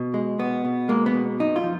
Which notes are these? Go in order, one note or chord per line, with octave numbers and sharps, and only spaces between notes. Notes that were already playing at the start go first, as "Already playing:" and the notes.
Already playing: B2
G#3
B2 B3
B2
G#3 A#3
B3
B2
F#2 D#4
F4
F3